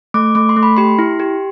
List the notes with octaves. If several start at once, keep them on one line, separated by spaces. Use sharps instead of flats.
A3 D6
A3 D6
C6
A3
B5
G4 C6
E4
G4